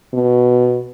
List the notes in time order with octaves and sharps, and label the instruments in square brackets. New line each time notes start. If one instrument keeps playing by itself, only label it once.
[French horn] B2